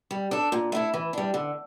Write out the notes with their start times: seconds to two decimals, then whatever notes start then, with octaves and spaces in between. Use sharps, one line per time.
0.11 G3
0.31 D4 A4
0.52 A#2
0.72 A3 E4 A4
0.94 E3
1.13 G3 D4
1.34 D3